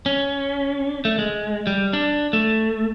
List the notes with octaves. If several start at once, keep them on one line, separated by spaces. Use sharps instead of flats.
C#4
A3
G#3
G3
D4
A3